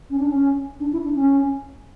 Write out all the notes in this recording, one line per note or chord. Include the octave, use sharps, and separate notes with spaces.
C#4
D4
C#4
D4
E4
D4
C#4